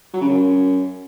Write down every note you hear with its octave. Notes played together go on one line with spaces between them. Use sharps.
F#3
C#3
F#2